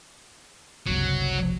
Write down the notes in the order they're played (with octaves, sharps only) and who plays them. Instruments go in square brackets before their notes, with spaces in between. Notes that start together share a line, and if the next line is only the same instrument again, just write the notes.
[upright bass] F#1 C2 [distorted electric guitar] F#3